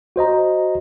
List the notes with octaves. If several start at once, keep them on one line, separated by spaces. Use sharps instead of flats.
F#4 C5 D#5 A#5